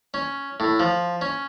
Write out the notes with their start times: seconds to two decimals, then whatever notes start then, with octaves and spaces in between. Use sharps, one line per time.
0.14 C#4
0.60 A2
0.80 F3
1.21 C#4